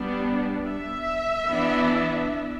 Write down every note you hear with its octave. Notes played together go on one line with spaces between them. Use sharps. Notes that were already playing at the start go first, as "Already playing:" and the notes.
Already playing: G3 B3 D4
E5
E3 B3 D4